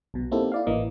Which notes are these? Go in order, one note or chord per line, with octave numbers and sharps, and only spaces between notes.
B1 B2
A#3 C4 D#4 E4 G4 A4
E4 D5 F5
A1 E3 A#3 D#5